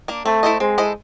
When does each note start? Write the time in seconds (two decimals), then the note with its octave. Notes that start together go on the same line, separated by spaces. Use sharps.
0.08 A#3 D4
0.25 A3 C4
0.43 E4 A4 C5 D#5
0.60 G#3 C4
0.78 E4 A4 C5 D#5